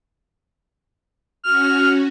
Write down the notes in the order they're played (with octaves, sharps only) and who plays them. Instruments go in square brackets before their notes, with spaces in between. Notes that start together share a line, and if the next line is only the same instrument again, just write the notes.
[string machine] C#4 F#4 [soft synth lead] F6